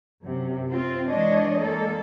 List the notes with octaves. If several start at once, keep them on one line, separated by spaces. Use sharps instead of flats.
F#2 C3
C4 F4
E3 G#3 D4 C#5 D#5
G#3 A#3 A4